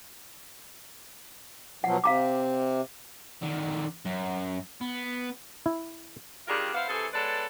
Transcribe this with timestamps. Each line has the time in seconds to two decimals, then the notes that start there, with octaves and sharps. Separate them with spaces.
1.84 B2 F3 F#3 F#5
2.04 C3 F5 A#5 D6
3.42 D3 D#3
4.06 F#2
4.81 B3
5.66 E4
6.48 D#3 G3 D4 F4 G#4 A#4
6.74 B3 E4 C5 F5
6.89 C3 E3 G#4 A4
7.14 G#3 B3 A4 B4 C#5 D5